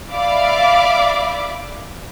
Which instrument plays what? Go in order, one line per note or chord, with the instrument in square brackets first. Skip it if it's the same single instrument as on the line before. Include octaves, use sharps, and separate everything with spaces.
[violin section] D5 E5 F5 B5 D6